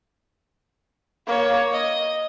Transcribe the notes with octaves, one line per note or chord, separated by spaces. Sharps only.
A#3 C#5
D#5